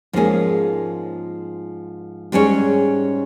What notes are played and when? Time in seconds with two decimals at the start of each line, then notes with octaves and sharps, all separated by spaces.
0.13 G#2 F3 A#3 C#4 G#4
2.32 G#2 G3 C#4 G#4 C#5